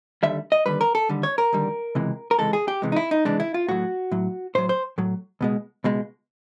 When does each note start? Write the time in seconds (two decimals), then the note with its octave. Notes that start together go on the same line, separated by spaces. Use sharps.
0.23 D#2 D3 G3 E5
0.52 D#5
0.66 D#2 D3 G3 B4
0.81 A#4
0.95 A4
1.09 D#2 D3 G3
1.23 C#5
1.38 A#4
1.53 D#2 D3 G3
1.95 C#2 C3 E3 G#3
2.31 A#4
2.39 C#2 C3 E3 G#3 A4
2.53 G#4
2.68 G4
2.82 C#2 C3 E3 G#3
2.92 D#4
2.96 E4
3.11 D#4
3.25 C#2 C3 E3 G#3 D4
3.40 E4
3.54 F4
3.68 A2 F#3 F#4
4.11 A2 F#3
4.55 A2 F#3 C5
4.69 C5
4.98 A2 F#3
5.41 C#2 B2 G#3
5.84 C#2 B2 G#3